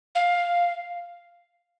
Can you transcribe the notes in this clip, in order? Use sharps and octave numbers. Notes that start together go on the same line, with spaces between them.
F5